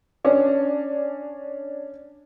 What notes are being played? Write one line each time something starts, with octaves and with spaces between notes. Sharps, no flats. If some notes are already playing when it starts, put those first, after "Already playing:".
C#4 D4